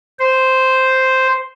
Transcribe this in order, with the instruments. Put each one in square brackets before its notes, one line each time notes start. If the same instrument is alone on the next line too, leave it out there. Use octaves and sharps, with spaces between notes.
[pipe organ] C5